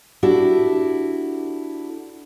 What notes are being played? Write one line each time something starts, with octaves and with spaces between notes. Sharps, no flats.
D4 E4 F#4 G4 A4